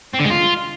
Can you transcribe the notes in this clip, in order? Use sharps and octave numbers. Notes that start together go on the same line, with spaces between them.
C4
D3
G#3
F4